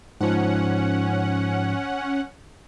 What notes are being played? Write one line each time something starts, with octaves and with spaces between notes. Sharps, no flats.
G#2 F3 C#4 F#5